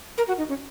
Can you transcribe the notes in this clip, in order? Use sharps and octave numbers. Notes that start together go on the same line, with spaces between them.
A#4
F#4
D#4
C#4